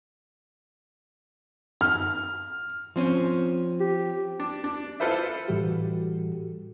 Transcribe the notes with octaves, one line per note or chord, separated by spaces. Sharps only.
F6
F3 C4 C#4
G4
D4
D4
E4 F4 A4 B4 C5 E5
A2 E3 G3 F#4 G4 A4